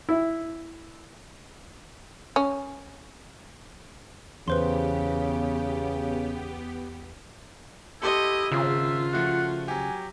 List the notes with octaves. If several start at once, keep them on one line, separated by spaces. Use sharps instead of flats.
E4
C#4
E2 C#3 B3 G4 B4 C5 C6
E4 G4 A4 D#5 C6 G7
G#1 C#3 F4 E5
F3 A3 F#4 F#5
F#3 G4 G#5